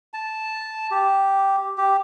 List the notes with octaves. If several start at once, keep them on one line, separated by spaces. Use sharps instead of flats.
A5
G4
G4